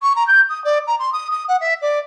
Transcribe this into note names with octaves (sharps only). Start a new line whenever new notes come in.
C#6
A#5
G6
D#6
D5
A#5
C6
D#6
D#6
F#5
E5
D5